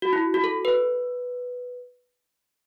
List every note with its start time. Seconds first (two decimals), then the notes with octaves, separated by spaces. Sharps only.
0.02 F#4
0.13 E4
0.34 F#4
0.44 A4
0.65 B4